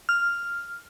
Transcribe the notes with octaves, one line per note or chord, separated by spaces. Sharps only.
F6